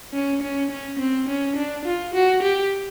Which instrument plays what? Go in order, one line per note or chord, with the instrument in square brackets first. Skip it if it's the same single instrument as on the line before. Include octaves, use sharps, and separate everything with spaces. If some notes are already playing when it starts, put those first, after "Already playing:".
[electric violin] C#4
C#4
C#4
C4
C#4
D4
F4
F#4
G4